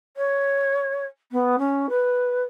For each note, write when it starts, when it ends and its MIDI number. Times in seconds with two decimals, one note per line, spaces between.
0.16 1.04 73
1.32 1.56 59
1.58 1.86 61
1.89 2.42 71